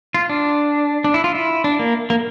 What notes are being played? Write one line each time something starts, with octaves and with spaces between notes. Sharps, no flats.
F4
D4
D4
E4
F4
E4
D4
A#3
A#3